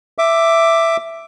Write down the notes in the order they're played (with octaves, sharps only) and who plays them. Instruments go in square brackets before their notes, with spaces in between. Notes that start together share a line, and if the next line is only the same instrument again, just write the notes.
[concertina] E5 D6